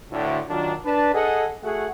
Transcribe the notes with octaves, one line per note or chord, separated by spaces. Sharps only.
D2 A2 D3
D#3 F#3 D4 F4
D4 B4 A5
G#4 A4 D#5 F#5
A3 F#4 G#4 A4 F#5